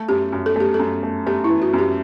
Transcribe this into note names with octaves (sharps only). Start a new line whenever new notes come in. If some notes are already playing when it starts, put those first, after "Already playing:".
Already playing: A3
F#2 G4
F#2
A4
A3 G4
A4
F#2
A3
A3 G4
E4
E3
F#4
F#2 G4